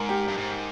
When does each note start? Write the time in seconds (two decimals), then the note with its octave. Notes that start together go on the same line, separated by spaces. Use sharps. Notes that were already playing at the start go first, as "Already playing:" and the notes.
Already playing: G#2 A#4
0.09 G4
0.28 G2
0.37 G#2